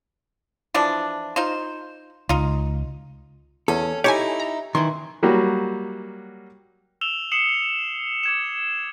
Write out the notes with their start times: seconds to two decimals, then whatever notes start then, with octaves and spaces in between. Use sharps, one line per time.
0.74 E3 F3 D4
1.36 D#4 F4 C5
2.29 C#2 D#4 F4
3.68 E2 C#4 A4
4.04 D#4 E4 G4 C#5 G#5
4.40 A#5
4.75 D#3 E3 E4 C6
5.23 F#3 G3 A#3 F#4
7.01 E6 E7 F7 G7
7.32 D#6 C7 C#7 E7 F#7
8.23 D6 G#6 E7